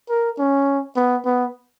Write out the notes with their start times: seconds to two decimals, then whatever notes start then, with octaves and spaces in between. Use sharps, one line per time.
0.10 A#4
0.39 C#4
0.96 B3
1.25 B3